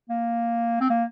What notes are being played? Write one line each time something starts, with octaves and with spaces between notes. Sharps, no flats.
A#3
C4
A#3